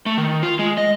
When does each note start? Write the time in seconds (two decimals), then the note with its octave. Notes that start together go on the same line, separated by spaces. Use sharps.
0.06 A3
0.18 D#3
0.43 F4
0.59 G#3
0.77 D#5